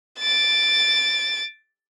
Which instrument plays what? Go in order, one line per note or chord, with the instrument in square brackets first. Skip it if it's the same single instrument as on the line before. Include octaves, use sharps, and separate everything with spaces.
[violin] A6 D7